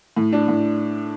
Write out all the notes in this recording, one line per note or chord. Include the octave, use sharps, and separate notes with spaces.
A2
D4
A2